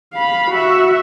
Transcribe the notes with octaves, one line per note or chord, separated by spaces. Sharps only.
F5 B5
F#4 E5